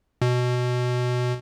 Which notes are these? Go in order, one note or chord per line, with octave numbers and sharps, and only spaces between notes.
B2